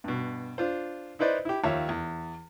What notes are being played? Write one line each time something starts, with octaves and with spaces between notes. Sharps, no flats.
G2 B2
D4 F4 C5
D#4 E4 B4 C5 D5 D#5
E4 G4
D#2 F3 G4 C#5 E5 F5
E2